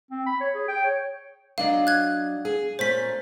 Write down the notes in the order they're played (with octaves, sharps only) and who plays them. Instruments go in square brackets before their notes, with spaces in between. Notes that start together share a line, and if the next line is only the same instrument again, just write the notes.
[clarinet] C4
B5
C#5
G#4
G5
C#5
[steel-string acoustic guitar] F#3 D4 D#5 [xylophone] F5
[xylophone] F#6 G#6
[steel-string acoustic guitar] G#4
[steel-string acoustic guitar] A#2 A3 C#4 [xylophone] C5 B6